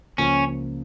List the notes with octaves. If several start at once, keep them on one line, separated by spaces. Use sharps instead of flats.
C#2 C#3 F3 A#3 C#4